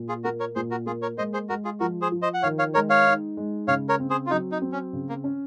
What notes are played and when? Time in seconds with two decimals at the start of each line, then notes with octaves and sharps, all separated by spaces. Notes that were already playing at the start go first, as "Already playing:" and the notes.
Already playing: A#2
0.09 F4 G#4
0.24 A#3 F#4 A#4
0.40 A#4 C#5
0.56 A#2 G#4 C5
0.71 F#4 A#4
0.86 A#3 F4 G#4
1.02 A#4 C#5
1.18 G#3 C5 D#5
1.33 G#4 C5
1.49 G#3 F#4 A#4
1.65 F4 G#4
1.80 F3 F#4 A#4
2.02 G#4 C5
2.12 F3
2.22 C5 D#5
2.34 F#5
2.43 D#3 C#5 F5
2.59 C#5 F5
2.74 G#3 A#4 C#5
2.90 C#5 F5
3.06 D#4
3.37 G#3
3.68 C#3 C#5 F5
3.89 A#4 C#5
4.00 C4
4.10 G#4 C5
4.26 F4
4.31 F#3 D#4
4.52 D#4
4.62 C4
4.72 C#4
4.93 C#3
5.09 A#3
5.24 C#4